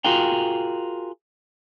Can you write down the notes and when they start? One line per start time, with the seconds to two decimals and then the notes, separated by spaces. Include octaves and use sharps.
0.04 F4 F#4 G#4 A#4 F5 G5